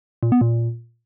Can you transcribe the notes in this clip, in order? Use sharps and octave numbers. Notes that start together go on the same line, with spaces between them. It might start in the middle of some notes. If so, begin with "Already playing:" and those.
A#2
B3
A#2